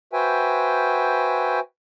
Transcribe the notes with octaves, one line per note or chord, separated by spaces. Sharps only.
F#4 B4 C5 E5 G5 G#5